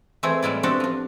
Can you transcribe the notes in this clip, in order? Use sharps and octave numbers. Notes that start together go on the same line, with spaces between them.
E3 A3 C4 E4 G#4 A4
A2 G3 G#3 E4 D5
B3 C4 D4 F#4 G4 A4
F3 D4